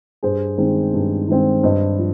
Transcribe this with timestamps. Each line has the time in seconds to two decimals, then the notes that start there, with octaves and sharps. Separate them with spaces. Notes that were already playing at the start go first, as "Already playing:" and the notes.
0.23 G2 G#4 C5
0.58 D#3 G#3 C4
0.94 G2
1.28 D#3 G#3 C4
1.63 G2 C5 D#5
1.99 F3